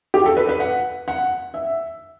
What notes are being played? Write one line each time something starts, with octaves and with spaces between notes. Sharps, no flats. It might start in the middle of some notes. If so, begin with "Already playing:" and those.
G4
A4
B4
B4
F#5
F#5
E5